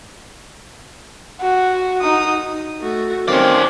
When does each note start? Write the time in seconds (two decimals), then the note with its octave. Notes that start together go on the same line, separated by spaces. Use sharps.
1.41 F#4
2.02 D#4 D#6
2.82 A3 F#4
3.28 D#3 C4 C#4 D5 F5 C6